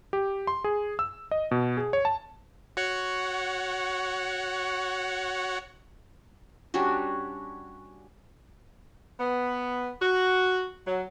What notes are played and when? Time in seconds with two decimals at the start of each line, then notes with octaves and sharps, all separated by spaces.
0.13 G4
0.47 C6
0.64 G#4
0.99 E6
1.31 D#5
1.51 B2
1.77 G#4
1.93 C#5
2.05 A5
2.77 F#4 C#5 F#5
6.74 G3 C#4 D4 F#4
9.19 B3
10.00 F#4
10.86 F#3